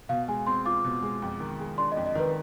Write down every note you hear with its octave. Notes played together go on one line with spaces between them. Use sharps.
B2 F5
G#3 G#5
C4 C6
F4 D6
B2
G#3
F2
D#3
G#3
D4 C6
D#5
F2
D#5
D#3 B4